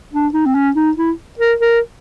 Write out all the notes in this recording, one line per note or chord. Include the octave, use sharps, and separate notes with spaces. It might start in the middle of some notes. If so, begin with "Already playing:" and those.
D4
D#4
C4
C#4
D#4
E4
A#4
A#4